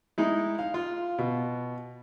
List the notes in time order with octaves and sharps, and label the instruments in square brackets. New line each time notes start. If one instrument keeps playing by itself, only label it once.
[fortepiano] G#3 D#4 E4
F5
F4
B2